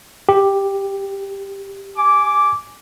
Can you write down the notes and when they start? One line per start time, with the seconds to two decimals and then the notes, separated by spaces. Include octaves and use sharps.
0.29 G4
1.97 G#5 D6